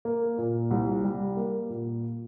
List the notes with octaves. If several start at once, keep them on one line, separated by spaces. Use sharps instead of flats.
A#3
A#2
C2
G3
A#3
A#2